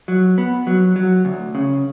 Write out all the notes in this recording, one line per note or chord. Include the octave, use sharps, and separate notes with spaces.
F#3
B3
F#3
F#3
D2
C#3